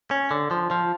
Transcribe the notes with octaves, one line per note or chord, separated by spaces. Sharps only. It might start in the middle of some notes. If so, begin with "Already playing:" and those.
C#4
D3
F3
F3